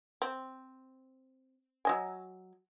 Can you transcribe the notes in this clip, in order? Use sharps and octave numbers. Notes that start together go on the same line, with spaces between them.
C4
F#3 D#5 G#5